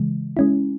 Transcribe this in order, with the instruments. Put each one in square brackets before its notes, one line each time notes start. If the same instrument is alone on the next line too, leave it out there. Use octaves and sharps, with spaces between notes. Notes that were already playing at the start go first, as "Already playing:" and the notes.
Already playing: [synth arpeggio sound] C#3 E3 G#3
G#3 C#4 E4